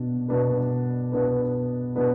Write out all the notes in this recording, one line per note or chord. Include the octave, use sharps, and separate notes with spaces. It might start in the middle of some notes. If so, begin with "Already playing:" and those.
Already playing: B2 B3 D4
B2 B3 D4 B4
B2 B3 D4 B4
B2 B3 D4 B4